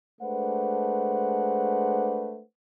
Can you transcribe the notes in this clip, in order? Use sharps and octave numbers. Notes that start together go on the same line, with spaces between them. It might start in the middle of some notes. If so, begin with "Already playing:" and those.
G#3 A3 D4 B4 C5 F#5